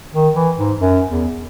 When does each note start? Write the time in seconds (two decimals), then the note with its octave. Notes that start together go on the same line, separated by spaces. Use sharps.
0.14 D#3
0.35 E3
0.58 G#2
0.80 F#2
1.08 E2